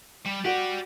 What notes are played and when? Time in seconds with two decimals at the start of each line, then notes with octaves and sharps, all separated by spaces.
0.26 G3
0.45 F#4 G4 D5